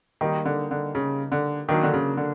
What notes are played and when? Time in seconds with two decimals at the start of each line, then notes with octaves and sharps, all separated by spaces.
0.21 D#3 G3 A#3 D#4 G4
0.45 D3
0.71 D3
0.95 C#3
1.32 D3
1.69 D#3 F#3 A#3 D4
1.83 D3
1.94 C#3
2.17 D3